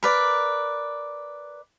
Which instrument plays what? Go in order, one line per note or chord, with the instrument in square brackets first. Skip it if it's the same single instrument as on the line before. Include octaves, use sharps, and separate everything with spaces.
[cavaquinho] A#4 B4 D5